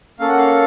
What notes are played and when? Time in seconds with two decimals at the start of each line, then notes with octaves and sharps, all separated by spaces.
0.19 A#3 C#4 A4 F5
0.29 F#5
0.38 F5